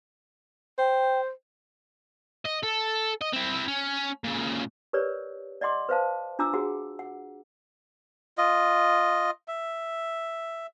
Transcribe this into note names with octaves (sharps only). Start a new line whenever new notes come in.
C5 G5
D#5
A4
D#5
C4 E4
C#4
A#2 C#3
G4 A#4 B4 C#5 D5
D5 D#5 F#5 C6 D6
B4 C5 F5 A5
D4 F4 A#5 D6 E6
F#4 G#4 F#5
F#5
F4 D#5
E5